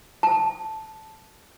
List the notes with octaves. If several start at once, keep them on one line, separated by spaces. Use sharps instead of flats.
A5